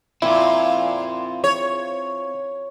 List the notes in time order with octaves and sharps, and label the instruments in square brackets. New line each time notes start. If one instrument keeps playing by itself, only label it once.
[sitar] A#2 [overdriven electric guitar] C4 F4 [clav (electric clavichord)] E4
[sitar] C#5